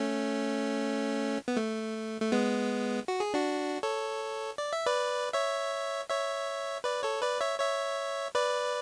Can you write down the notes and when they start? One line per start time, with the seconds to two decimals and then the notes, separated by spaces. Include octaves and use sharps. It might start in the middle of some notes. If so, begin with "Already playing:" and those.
Already playing: A3 C#4
1.48 B3
1.57 A3
2.22 A3
2.32 G#3 B3
3.08 F#4
3.20 G#4
3.34 D4 F#4
3.83 A4 C#5
4.58 D5
4.73 E5
4.86 B4 D5
5.33 C#5 E5
6.10 C#5 E5
6.84 B4 D5
7.03 A4 C#5
7.22 B4 D5
7.41 C#5 E5
7.60 C#5 E5
8.35 B4 D5